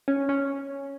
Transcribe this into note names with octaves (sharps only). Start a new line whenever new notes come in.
C#4
C#4